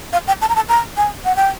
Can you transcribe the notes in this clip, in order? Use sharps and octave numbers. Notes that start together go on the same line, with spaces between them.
F5
G5
A5
A#5
A5
A#5
G#5
F#5
G5